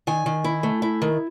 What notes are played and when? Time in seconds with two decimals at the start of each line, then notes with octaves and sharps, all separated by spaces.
0.07 D#3 G#5
0.26 D#3
0.44 E4
0.63 A3
0.82 E4
1.02 D#3